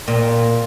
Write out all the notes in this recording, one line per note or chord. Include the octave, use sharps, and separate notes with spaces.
A#2